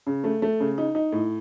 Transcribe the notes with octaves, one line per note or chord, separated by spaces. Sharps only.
C#3
A3
A3
C#3
D#4
D#4
A2